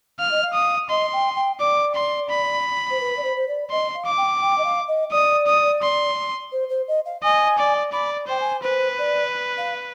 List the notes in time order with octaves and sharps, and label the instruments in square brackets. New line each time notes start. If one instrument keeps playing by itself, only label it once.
[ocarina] F5 [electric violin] F6
[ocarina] D#5
F5
[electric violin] D#6
[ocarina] D#5 [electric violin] C6
[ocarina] G5
G5
[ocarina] D5 [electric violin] D6
[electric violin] C6
B5
[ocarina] C5
B4
D5
C5
C5
D5
[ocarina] D#5 [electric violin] C6
[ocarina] F5
[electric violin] D6
[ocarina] G5
G5
D#5
F5
D#5
[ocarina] D5 [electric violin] D#6
[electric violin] D#6
C6
[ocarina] C5
C5
D#5
F5
[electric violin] D#5 [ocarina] G#5
[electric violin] D5
[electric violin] D5 [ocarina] B5
[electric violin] C5 [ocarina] G5
[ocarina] G#5
[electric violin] B4 [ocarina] C5
[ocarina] D5
F5